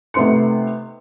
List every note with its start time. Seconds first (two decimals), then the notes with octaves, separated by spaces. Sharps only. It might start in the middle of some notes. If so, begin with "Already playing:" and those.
0.14 C3 A3 B3 D#4 C6 C#7